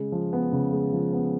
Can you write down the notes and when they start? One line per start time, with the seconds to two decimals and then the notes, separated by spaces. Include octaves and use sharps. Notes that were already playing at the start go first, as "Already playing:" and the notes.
Already playing: C#3 G#3
0.12 F3
0.33 B3
0.52 C#3
0.72 G#3
0.93 F3
1.13 B3